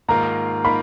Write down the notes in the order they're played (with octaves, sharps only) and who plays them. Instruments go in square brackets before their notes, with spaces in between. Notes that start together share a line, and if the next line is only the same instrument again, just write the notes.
[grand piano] G#2 D#3 A#3 F4 [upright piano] A#5
[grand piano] D#3 A#3 F4 [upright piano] B5